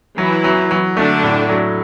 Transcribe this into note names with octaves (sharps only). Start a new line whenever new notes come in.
E3 F#3 E4
F#3
F#3
D3 A3 D4
A2
F#3